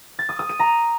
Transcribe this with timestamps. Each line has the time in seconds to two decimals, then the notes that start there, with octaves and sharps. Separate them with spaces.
0.19 A6
0.29 D#6
0.39 D#6
0.49 D#7
0.59 A#5